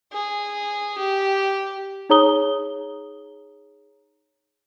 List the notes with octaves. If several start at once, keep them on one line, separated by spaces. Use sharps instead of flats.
G#4
G4
D#4 G#4 C#5 A#5 D#6 G7